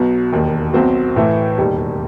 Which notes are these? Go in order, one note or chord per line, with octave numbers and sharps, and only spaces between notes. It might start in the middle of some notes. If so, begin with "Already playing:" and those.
Already playing: B1 B2 F#3
E1 D#2 D#3
B1 B2 F#3 C4 F#4
A2 E3 A3
E1 D#2 D#3 G3